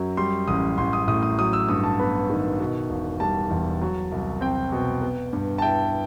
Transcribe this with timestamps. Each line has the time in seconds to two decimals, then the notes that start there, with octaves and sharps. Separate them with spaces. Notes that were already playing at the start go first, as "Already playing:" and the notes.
Already playing: F#2 F#3
0.17 G3 C6
0.48 A1 D#6
0.78 A1 C6
0.93 D#6
1.07 A2 D#6
1.23 D#6
1.38 F#3 D#6
1.53 E6
1.68 G2 D#6
1.84 A5
1.99 B3 B5
2.30 D#3
2.60 B2
2.89 E1
3.20 G3 A5
3.50 E2
3.81 F#3
4.12 C2
4.41 C4 G5
4.72 B2
5.02 B3
5.33 G2
5.58 A5
5.62 E4 G5